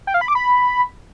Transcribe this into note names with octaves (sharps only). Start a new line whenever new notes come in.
G5
F5
B5
D6
B5